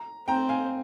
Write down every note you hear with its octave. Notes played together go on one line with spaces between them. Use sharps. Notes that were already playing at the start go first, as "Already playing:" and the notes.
Already playing: A#5
C4 G5 A#5
F5 G#5